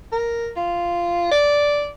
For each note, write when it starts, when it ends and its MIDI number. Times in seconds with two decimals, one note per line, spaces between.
0.12 0.49 70
0.57 1.28 65
1.31 1.89 74